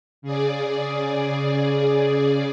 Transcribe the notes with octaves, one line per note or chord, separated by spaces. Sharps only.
C#3 G#4 D5